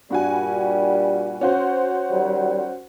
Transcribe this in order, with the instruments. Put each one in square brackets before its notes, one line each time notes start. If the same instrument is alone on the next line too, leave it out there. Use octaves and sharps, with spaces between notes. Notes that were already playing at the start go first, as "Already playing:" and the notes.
[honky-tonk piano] G2 F#4 G#5 [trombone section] A#2 G3
[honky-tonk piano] C#4 F#4 C5
[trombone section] D#3 F#3 G3